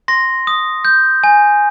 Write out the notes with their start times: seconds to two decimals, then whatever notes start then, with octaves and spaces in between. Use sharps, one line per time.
0.08 C6 A#6
0.47 D#6
0.85 G6
1.24 G#5